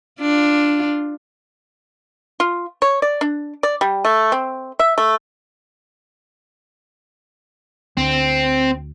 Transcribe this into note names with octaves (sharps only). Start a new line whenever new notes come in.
D4 F4
F4
C#5
D5
D4
D5
G3
A3
C4
E5
A3
D2 C4